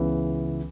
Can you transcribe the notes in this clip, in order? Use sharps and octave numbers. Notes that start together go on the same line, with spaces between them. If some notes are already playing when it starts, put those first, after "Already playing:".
Already playing: C#2 C#3 E3 B3